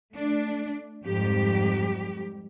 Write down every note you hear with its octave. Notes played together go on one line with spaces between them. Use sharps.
A3 D4
F2 G#2 G3 G4